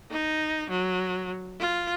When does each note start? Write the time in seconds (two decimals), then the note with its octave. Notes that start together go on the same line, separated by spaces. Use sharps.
0.11 D#4
0.70 F#3
1.59 F4